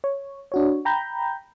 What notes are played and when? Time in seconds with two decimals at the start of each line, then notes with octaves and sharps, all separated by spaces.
0.04 C#5
0.52 D4 F#4 C#5
0.85 G5 A#5 B5 G6